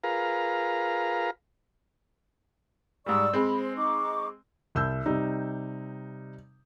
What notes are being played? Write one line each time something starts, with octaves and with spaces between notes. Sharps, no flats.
F4 G#4 A#4 B4 F5 A#5
G#2 G3 D5 C#6 E6
G#3 C4 B5
C5
D#4 C#6 D6
C2 E6 G6
C3 G3 D#4